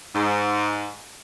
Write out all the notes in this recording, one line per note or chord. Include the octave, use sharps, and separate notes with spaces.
G#2